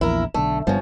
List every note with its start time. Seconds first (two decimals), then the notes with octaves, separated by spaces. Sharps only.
0.01 A#1 E2 E4 A#4
0.34 B1 D3 A3
0.67 G1 G2 C#3 F3 B3